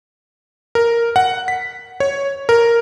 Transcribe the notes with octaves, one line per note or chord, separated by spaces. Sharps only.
A#4
F#5
B6
C#5
A#4